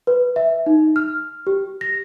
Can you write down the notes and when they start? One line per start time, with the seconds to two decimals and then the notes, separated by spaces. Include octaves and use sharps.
0.07 B4
0.36 E5
0.66 D#4
0.96 F6
1.47 G4
1.81 A#6